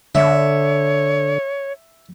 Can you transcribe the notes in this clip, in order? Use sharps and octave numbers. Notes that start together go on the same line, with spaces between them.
D3 C#5 E5